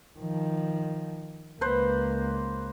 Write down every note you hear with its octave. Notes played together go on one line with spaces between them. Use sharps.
D#3 F3
C#2 A#3 B4 C5